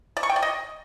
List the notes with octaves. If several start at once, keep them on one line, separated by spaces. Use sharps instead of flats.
D5
C#6
G5
D5
D#5